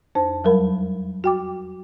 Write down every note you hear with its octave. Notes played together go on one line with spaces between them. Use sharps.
F2 D4 C5 A5
E2 F#3 G3 A#4 F5 B5
F#4 G5 D6